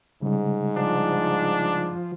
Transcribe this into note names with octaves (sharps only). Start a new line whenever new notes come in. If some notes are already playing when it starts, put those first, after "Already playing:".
G#2 C#3 G3
F3 D4